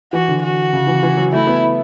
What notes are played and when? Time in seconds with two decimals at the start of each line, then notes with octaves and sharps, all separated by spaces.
0.13 E3 F#4
0.28 D3
0.43 F#4
0.73 C#3
0.87 E3
1.03 E3
1.17 F#3
1.33 A3 E4
1.47 B3